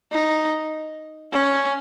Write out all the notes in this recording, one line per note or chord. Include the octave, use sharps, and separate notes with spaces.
D#4
C#4